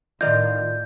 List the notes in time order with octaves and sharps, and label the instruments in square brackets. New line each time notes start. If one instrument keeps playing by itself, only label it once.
[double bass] A2 [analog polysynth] D#3 F4 [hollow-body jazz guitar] D5 D#5 [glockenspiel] G6